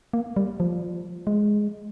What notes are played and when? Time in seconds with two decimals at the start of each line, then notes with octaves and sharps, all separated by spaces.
0.13 A#3
0.36 G3
0.60 F3
1.27 G#3